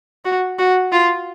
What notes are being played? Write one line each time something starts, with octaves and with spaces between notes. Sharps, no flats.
F#4
F#4
F4